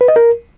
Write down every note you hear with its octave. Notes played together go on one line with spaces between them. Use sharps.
B4
D#5
A#4